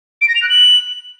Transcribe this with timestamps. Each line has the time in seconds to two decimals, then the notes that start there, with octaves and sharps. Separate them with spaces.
0.21 D7
0.28 A#6
0.35 F7
0.42 F#6
0.49 F#7